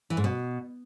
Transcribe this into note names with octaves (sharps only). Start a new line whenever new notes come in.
E3
G#2
B2